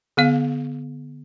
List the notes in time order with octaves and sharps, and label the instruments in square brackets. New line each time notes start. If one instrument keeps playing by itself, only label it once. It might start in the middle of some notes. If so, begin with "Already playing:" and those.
[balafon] D3 B3 F5